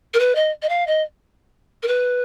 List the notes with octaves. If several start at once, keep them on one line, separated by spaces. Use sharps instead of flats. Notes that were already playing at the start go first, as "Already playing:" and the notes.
A#4
B4
D#5
D#5
F5
D#5
A#4
B4